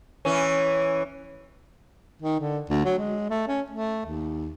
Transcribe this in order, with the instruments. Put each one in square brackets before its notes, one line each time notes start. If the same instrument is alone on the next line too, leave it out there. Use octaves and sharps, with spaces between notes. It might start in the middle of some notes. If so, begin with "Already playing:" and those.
[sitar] E3 C#4
[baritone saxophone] D#3
D3
D2
F#3
G#3
A3
C#4
A3
D#2